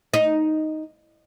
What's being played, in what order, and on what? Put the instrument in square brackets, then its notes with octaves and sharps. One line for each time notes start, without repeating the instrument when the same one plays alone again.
[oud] D#4